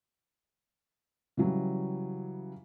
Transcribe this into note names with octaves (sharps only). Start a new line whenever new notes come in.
C#3 E3 F#3 G3